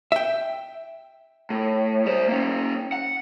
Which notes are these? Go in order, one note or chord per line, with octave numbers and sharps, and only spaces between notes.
E5 G5
A2
G3 C5
A#3 C#4
F#5